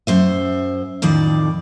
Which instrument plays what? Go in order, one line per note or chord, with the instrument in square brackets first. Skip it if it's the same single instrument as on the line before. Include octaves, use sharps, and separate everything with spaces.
[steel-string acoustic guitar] F#2 C5 E5
F2 A2 D#3 D5